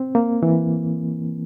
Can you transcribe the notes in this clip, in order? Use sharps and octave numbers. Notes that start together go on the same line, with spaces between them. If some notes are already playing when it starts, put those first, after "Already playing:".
Already playing: C4
A#3
E3